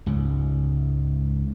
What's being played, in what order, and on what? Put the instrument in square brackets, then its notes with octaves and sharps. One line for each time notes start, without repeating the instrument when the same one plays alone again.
[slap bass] C#2 G#2 C#3